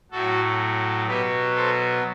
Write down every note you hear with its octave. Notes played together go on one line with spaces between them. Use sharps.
A2 F#3 A3 F#4 A4
B2 F#3 B3 G4 B4
A4 C5